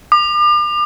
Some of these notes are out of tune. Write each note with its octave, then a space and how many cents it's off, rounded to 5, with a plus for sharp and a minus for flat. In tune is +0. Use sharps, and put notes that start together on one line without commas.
D6 +40